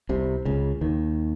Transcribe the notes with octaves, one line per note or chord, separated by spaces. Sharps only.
C2 C3
C#2 C#3
D#2 D#3